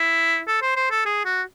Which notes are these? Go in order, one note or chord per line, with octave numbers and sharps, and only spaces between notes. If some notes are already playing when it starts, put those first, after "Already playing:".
Already playing: E4
A4
C5
C5
A4
G#4
F#4